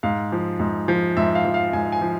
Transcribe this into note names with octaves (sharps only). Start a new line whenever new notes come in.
G#2 F5
F3
G#2
F3
G#2 E5
F5
F3
F5
G#2 G#5
G#5
F3